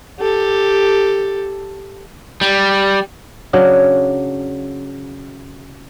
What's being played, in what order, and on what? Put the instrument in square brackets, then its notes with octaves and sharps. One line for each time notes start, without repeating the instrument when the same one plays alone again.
[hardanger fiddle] G4 A4
[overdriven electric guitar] G3
[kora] C#3 F#3 D4